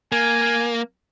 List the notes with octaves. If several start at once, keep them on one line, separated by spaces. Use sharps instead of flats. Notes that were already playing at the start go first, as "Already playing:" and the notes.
A#3 G#5